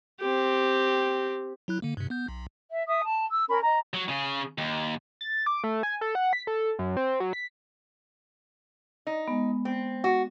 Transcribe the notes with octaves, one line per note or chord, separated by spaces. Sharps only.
C4 G4
F#3 E4 F#6
D3 A#3
G2 C3
B3 G6
B1
E5
E5 D#6
A5
E6
C#4 A#4 B5
D#5 A#5
F#3
C#3 G#4
D#2
A6
D6
A3
G#5
A4
F#5
B6
A4
F#2
C4
F#3
B6
D#4
G#3 B3
C4
F#4